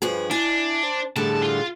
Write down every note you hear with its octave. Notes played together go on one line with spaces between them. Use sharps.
G2 F3 G#4 B4
D4 E4 G#5
C5
A2 D3 G3 G#4 A5
F4